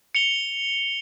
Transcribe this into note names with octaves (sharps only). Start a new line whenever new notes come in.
C#7 F7 G7